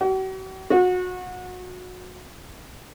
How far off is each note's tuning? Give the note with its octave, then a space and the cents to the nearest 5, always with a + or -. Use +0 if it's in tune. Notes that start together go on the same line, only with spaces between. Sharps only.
F#4 +45
F#4 -25